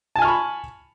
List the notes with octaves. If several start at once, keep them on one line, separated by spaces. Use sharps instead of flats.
G#5 A5 B5 C#6 F6